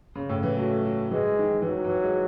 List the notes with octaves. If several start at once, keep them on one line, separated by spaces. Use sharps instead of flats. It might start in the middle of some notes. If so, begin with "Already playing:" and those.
C#3
A2
E3
F#3 A3
F#3
E3 G#3
D#3
E3
D#3 F#3
E3
G#3